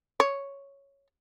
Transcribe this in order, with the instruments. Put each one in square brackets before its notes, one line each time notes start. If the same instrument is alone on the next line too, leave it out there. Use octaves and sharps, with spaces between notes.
[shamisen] C#5